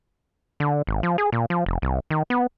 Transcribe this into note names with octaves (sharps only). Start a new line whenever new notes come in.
D3
G#1
F3
G#4
A#2
F3
F1
C2
D#3
B3